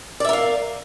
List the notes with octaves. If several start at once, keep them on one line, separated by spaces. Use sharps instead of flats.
A#4 D5 E5 F5